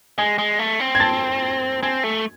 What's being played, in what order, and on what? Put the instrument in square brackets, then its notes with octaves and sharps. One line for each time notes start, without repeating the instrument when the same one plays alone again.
[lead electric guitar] G#3 [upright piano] G#5 G#6
[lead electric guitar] G#3
A3
C4
[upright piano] G#6
A5 A6
[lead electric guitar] C4 [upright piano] G#5 G#6
[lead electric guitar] A3